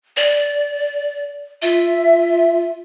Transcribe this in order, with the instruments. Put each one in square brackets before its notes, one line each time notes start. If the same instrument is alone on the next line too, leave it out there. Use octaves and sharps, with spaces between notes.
[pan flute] D5
[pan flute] F4 [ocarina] E5